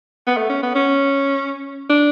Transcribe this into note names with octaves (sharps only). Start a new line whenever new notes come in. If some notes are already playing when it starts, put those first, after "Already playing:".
B3
A3
C#4
B3
C#4
D4